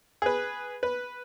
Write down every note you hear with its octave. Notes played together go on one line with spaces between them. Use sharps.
G#4 B4
B4